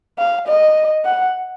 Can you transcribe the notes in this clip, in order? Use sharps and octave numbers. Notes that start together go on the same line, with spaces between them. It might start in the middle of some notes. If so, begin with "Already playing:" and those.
F5
D#5
F#5